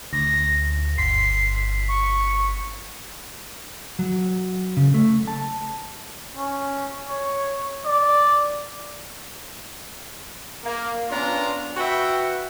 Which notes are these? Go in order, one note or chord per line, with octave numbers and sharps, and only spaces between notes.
D2 A#6
G1 C6 B6 C7
C#6
F#3
C#3
A3
A5
C#4
C#5
D5
A#3
B3 C#4 D4 F4 A#5
F#4 B4 E5 F#5 G5